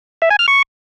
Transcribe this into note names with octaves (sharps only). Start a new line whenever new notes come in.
E5
G#5
F6
C#6